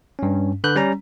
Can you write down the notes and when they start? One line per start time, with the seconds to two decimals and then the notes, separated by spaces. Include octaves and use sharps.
0.19 G2 C#4
0.64 D3 B4 F#6 G6
0.76 G3 C#4 A#5